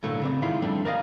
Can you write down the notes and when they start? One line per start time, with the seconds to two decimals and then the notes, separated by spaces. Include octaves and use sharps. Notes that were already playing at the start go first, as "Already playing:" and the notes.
0.03 B1 A2 D3 F#3 A3 A#3
0.22 C#3 C4 D5
0.42 G#2 D#3 E4 F4 C6
0.62 F2 G3 A3 D4
0.85 A#4 D5 D#5 F5